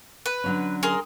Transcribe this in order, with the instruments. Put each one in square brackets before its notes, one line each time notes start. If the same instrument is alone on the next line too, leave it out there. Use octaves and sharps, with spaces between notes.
[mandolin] B4
[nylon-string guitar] D3 F#3 C#4
[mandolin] G#4 A#4 C6